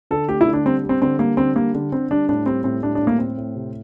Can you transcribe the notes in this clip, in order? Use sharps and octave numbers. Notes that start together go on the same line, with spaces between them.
D3 A4
A3 G4
E4
D3
D4
G3 C4
G3
C4
D3 C4
G3 A#3
D3 C4
G3 A#3
D3
D3 C4
G3 D4
A2 D4
G3 C4
A2 C4
G3 D4
D4
A2
A#3
A2 C4
A2
C3